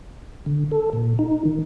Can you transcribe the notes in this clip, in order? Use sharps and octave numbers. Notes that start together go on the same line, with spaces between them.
D3
A4
A#2
D#4
D#3